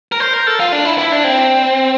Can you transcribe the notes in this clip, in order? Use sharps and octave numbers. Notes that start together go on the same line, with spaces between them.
A#4
C5
A#4
A4
F4
D4
E4
E4
D4
C4